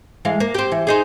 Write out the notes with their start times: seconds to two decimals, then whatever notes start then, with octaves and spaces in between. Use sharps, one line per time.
0.25 E3 G#3 F5
0.40 A#3
0.54 C4 G4
0.72 E3
0.87 C4 D#4 G#4